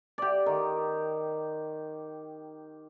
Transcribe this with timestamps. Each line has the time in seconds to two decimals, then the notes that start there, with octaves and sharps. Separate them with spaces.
0.18 G4 D5
0.46 D#3